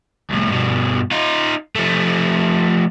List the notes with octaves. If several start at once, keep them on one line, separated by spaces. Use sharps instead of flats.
C2 A2
G2 B2
D#4 F4
F3 A3